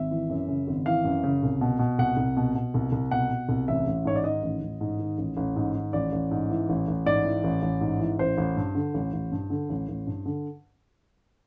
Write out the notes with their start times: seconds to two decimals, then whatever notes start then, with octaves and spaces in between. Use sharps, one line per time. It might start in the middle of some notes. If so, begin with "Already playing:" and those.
Already playing: G#1 E5
0.11 E3
0.30 F#2
0.48 C#3
0.67 G#1
0.86 E3 F5
1.04 F#2
1.24 C#3
1.43 C2
1.61 B2
1.79 B2
1.99 C2 F#5
2.17 C2
2.37 B2
2.55 B2
2.74 C2
2.92 C2
3.11 B2 F#5
3.30 B2
3.49 C2
3.68 A1 E5
3.87 A1
4.05 G#2 C#5
4.16 D5
4.24 D#3 D#5
4.43 A1
4.62 A1
4.81 G#2
4.99 D#3
5.18 A1
5.37 A1
5.56 G#2
5.75 D#3
5.93 A1 D5
6.12 A1
6.31 G#2
6.50 E3
6.69 A1
6.88 A1
7.06 G#2 D5
7.25 E3
7.44 A1
7.62 A1
7.81 G#2
8.00 E3
8.19 A1 C5
8.38 A1
8.57 G2
8.75 D3
8.94 A1
9.13 A1
9.32 G2
9.50 D3
9.70 A1
9.89 A1
10.07 G2
10.26 D3